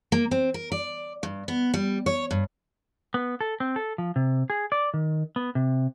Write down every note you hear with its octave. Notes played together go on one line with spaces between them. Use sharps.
A#3
C4
A#4
D5
G2
B3
G3
C#5
G2
B3
A4
C4
A4
F3
C3
G#4
D5
D#3
B3
C3